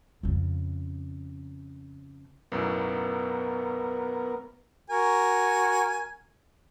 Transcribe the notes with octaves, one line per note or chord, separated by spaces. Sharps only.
F2 C#3
B1 F#2 A2 B3 A#4
F#4 A#4 G#5